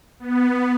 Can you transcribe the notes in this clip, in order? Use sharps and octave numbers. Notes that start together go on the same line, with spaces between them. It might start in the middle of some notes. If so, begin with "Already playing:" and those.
B3